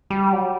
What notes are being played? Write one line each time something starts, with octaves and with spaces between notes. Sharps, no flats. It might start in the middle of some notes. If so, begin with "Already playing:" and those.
G3
F#3